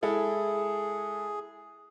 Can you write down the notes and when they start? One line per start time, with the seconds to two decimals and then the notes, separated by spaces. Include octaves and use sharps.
0.03 G#3 E4 G#4 A4